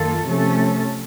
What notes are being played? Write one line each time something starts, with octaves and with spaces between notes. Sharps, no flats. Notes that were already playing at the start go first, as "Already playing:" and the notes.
Already playing: F#2 D#3 A#3 F4 A4
C3 F3 A3 C#4 A4